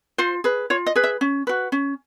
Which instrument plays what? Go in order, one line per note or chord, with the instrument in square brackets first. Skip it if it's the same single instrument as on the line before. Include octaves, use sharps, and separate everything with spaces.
[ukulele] F4 C5
G#4 B4
F4 C#5
D#5
G#4 B4
E5
C#4
F#4 B4
C#4